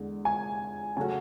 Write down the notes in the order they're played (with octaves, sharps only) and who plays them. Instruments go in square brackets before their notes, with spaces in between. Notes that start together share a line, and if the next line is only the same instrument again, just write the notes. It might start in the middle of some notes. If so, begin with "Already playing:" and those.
Already playing: [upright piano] E2 D3 G#3
[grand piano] G#5
[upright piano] C#3 F#3 A3 C#4 F#4 [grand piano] G#5